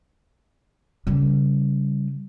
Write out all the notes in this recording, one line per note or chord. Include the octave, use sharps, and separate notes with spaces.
C#3 G3